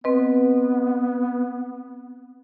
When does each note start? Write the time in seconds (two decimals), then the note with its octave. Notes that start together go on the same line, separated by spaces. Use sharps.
0.04 B3 C4 B4 D#5